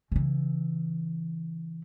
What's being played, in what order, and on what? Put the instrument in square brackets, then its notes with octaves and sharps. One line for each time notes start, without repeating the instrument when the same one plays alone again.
[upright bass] C#3 E3